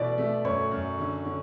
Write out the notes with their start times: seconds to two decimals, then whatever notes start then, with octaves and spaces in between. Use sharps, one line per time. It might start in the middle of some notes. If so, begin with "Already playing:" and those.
Already playing: B2 E3 E4 D5
0.18 A3
0.45 F#2 C#5
0.71 F#2
0.99 D3
1.25 D3